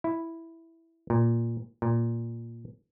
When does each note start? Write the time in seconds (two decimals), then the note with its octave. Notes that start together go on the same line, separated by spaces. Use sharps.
0.04 E4
1.10 A#2
1.82 A#2